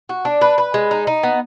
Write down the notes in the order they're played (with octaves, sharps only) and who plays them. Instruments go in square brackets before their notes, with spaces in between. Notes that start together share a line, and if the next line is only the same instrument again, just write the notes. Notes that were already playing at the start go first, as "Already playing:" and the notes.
[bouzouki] F#4
D4
B4
B4
G#3
D#4
D#4
B3